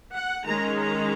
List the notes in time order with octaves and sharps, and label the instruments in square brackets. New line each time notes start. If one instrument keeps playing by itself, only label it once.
[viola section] F#5
D#3 G#3 C#4 A#5
A#5